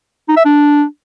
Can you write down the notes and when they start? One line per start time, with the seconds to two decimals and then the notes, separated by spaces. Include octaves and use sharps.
0.28 D#4
0.37 E5
0.45 D4